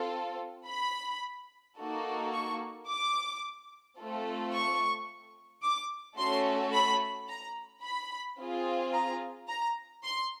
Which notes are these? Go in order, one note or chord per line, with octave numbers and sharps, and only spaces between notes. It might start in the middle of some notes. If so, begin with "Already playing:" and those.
Already playing: C4 F4 A4
B5
A#3 D#4 F#4 A4
C#6
D6
A3 C4 F4 A4
C#6
D6
A3 C#4 F#4 A4 C6
B5
A#5
B5
C4 F4 G#4
A#5
A#5
C6